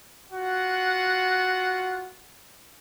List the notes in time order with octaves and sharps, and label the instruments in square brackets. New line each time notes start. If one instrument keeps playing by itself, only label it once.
[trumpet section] F4 F#4 F#5